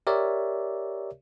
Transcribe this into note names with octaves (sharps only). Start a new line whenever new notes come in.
G4 A#4 C#5 D5 E5